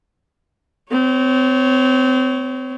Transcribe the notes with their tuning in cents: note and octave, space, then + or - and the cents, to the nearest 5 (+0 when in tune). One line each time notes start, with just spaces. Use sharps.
C4 -30 C#5 +0